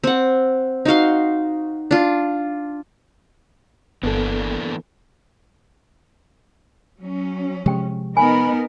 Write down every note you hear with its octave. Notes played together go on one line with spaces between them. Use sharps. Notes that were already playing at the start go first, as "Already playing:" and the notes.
C4 F#5
D#4 F#4 F5 C6
D4 F4
G1 E3 A#3 B3 D4 A4
F#3 C#4
C3 F3 G#3 G4 G5
B3 D#4 A#4 G#5 B5